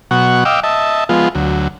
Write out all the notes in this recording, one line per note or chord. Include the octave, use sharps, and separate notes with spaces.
B2 F#3 F#5 C#6
D#5 F5 G5 D6 E6
D#5 E5 A5
F3 G#3 B3 F4
D2 F#3